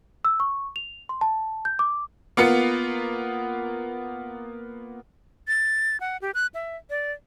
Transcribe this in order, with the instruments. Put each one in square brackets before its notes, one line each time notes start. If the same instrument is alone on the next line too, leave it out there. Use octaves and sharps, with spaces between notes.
[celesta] E6
C#6
F7
C6
A5
G6
D6
[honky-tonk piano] A#3 B3 F4 C#7
[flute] A6
F#5
G4
F#6
E5
D5